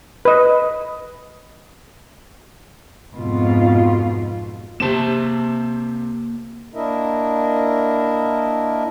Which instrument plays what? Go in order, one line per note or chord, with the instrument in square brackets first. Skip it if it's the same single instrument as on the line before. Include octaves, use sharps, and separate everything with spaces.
[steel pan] B4 D#5
[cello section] F2 G#2 B2 F4
[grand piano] C3 C4 E7 [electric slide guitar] A#3 A5
[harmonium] A#3 D4 E4 A#4 D#5 E5